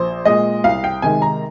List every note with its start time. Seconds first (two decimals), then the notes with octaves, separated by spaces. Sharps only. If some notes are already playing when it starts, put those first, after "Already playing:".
Already playing: A#1 C5
0.25 A#2 G#3 D#5
0.64 C2 F5
0.84 G5
1.02 C3 D#3 G#3 G#5
1.22 A#5